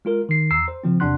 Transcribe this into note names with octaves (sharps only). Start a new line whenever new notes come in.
G#3 F4 A#4
D#3 C7
E2 A#5 E6 C7
C5
C#3 F3 C4
E2 C3 D4 F#5 C6 F#6